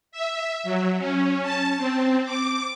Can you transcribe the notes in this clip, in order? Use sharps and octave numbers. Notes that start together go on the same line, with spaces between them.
E5
F#3
C#4
A5
C4
D6